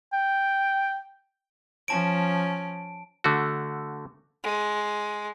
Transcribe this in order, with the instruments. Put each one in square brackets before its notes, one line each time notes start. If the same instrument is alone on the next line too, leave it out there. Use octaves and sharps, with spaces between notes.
[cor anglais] G5
[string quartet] F3 C#4 [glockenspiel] A5 D7
[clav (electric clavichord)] D3 A3 F#4
[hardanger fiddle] G#3